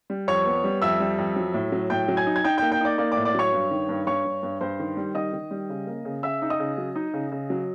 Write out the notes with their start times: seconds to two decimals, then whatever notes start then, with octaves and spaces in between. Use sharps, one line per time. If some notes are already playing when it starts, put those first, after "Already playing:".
0.10 G3
0.28 F2 C#5 C#6
0.46 B3
0.64 G3
0.82 F2 E5 E6
1.00 G3
1.18 F2
1.36 F#3
1.54 A2
1.72 F#3
1.90 A2 G5 G6
2.08 F#3
2.17 G#5 G#6
2.27 D#4
2.36 G#6
2.44 D#4 G5 G6
2.58 A#3 G5 G6
2.72 G5 G6
2.81 D#4 D5 D6
2.98 A#3 D5 D6
3.12 D5 D6
3.17 A2
3.25 D5 D6
3.35 F#3 C#5 C#6
3.52 G2
3.71 D#3
3.89 G2
4.07 G2 C#5 C#6
4.25 G2
4.43 G2
4.61 G2 C5 C6
4.79 D#3
4.97 G3
5.15 D#3 D#5 D#6
5.33 D#3
5.51 G3
5.69 C#3
5.87 A#3
6.05 C#3
6.23 C#3 E5 E6
6.42 D#4
6.50 D#5 D#6
6.60 C#3
6.78 F#3
6.96 D#4
7.14 C#3
7.32 C#3
7.50 F#3